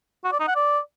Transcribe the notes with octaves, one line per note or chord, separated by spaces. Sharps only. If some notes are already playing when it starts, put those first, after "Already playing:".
F#4
D5
D#4
F#5
D5